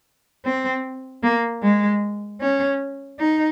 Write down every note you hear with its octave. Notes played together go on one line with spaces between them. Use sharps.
C4
A#3
G#3
C#4
D#4